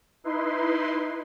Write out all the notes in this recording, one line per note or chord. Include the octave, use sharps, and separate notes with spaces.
D#4 E4 B4 C6